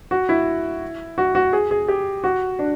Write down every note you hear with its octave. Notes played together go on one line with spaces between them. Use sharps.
F#4
E4
F#4
F#4
G#4
G#4
G4
F#4
D4